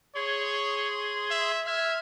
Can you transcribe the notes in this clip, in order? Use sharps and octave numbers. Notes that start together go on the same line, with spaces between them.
G#4 C#5 C6 G#6
E5
E5 F6 G#6